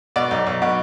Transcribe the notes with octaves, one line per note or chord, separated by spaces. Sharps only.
B2 D5
B1
B1
B2